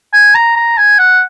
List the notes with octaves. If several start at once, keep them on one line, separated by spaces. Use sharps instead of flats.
G#5
A#5
A#5
G#5
F#5